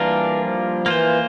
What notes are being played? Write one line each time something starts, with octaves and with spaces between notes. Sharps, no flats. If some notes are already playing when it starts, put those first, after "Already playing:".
Already playing: E3 G3 A#3 D4 F4 A#4
F3
E3 A#3 F4 C5